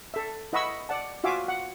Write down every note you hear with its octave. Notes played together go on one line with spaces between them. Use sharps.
A4 E5
E4 D#5 F#5 B5 C#6 E6
D5 F#5 A5
F4 F#4 E5 F5 G#5 D6
F#5